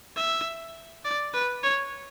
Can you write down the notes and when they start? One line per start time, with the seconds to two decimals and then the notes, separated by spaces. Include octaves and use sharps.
0.16 E5
1.05 D5
1.34 B4
1.63 C#5